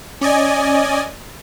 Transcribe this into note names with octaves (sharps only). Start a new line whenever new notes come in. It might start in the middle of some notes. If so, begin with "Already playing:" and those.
C#4 D5 D#5 G#5